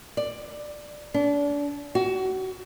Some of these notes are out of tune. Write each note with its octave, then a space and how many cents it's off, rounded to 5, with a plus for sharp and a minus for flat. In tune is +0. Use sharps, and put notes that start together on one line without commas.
D5 +10
D4 -30
F#4 +25